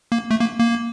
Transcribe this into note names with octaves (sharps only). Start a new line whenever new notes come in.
A#3
A3
A#3
A#3